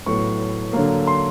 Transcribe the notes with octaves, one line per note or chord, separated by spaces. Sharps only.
A2 F#3 B3 C#6
D3 F#3 A#3
C6